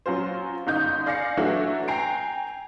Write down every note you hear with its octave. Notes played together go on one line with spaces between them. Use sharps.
F#3 C#4 F4 C5
G1 F#2 D#4 G6
D5 F5 G#5 A#6 C7 C#7
E3 F#3 A3 D4 F#4
G5 G#5 A#5 C7 D7